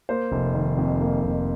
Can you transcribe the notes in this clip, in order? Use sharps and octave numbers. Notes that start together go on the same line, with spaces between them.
A#3 C5
F1
D#3
F2
A#3
F1